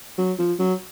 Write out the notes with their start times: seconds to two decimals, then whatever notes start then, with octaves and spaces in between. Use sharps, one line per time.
0.18 F#3
0.39 F3
0.59 F#3